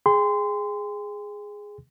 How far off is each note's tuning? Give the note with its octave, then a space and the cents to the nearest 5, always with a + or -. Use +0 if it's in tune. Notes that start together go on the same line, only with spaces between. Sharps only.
G#4 +0 G5 +45 C6 -25